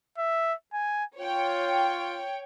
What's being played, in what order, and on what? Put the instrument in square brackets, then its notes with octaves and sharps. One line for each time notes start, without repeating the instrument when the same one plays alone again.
[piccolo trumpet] E5
G#5
[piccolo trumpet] F4 [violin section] C#5 G5